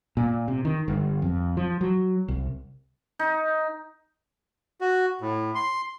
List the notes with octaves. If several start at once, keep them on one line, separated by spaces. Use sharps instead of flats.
A#2
C3
D#3
G1
F2
F3
F#3
C2
D#4
F#4
A2
C6